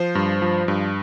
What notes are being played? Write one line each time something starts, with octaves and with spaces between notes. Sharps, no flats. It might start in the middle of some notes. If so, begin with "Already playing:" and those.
Already playing: F3 C5
G2
F3
G2